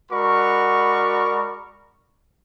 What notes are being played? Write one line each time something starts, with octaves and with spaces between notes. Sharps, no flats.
G#3 F#4 A#4 D5 B5 C#6